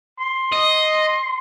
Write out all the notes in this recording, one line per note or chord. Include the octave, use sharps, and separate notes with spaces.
C6
D#5